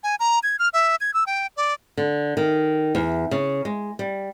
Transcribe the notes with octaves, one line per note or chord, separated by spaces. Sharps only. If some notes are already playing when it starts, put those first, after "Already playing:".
G#5
A#5
G#6
F6
E5
G#6
E6
G5
D5
D3
D#3
E2
C#3
G#3
G3